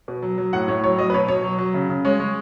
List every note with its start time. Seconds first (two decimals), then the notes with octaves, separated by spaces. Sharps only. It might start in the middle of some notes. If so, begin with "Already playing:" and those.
0.08 B2
0.22 F#3
0.38 F#3
0.53 A2 F#5
0.68 A2 C#5
0.84 F#3 C#5
0.98 F#3 D#5
1.10 B4
1.14 B2 C#5
1.28 B2 C#5
1.44 F#3
1.58 F#3
1.74 C#3
1.89 C#3
2.05 G#3 C#5
2.20 G#3